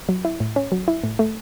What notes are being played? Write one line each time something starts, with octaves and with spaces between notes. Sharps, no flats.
F#3
E4
A2
C#4
F#3
E4
A2
A3